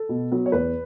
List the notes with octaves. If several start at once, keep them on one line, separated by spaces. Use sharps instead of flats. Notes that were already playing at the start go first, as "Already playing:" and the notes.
Already playing: A4
B2
F#3 B3
C#5
E2 B4